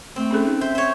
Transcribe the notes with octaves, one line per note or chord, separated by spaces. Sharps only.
A3 C4
C#4 G#4 A4
D#4
C5 E5
C5 C#5